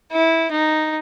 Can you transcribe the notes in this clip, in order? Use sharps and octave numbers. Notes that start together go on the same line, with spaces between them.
E4
D#4